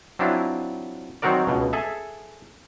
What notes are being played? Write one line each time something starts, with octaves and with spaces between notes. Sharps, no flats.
F#3 C4 D4 E4 F4
D#3 F#3 C4 F#4 A#4 D5
C#2 B2
G#4 A4 E5